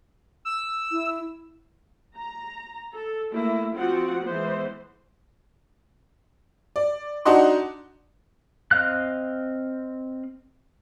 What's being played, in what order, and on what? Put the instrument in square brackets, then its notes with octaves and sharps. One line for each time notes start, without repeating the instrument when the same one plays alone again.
[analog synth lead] E6
[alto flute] E4
[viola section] A#5
A4
A3 A#3 E4
F3 C4 F4 F#4 F#5
E3 G#3 B3 C5
[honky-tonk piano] D5
D4 D#4 F#4 D#5 F#5 C6
[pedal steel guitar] C4 D#5 F5 F#6